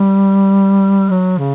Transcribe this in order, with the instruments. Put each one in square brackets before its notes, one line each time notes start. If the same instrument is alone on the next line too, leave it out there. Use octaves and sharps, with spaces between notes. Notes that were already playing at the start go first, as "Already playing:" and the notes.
Already playing: [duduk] G3
F#3
C#3